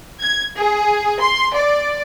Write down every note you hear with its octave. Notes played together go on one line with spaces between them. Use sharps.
G#6
G#4
C6
D5